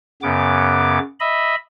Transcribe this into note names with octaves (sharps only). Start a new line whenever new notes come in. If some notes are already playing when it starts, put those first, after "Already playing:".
F#2 C#3 B3 D6
D#5 E5 B5